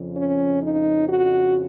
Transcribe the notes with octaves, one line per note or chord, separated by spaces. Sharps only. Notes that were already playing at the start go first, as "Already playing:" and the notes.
Already playing: F2 C#3 F3
C#4
D#4
F#4